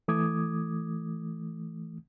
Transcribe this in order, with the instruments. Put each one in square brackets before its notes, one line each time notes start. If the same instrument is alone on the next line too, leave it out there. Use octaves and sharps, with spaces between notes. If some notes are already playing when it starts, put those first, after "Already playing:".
[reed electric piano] E3 A3 D6 D#6 G#6